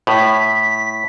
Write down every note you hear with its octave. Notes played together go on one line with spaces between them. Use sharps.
A2 B6